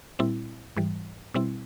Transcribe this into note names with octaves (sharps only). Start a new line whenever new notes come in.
A#2 G3 C4 E4
G#2 E3 G3
B2 G3 C4 E4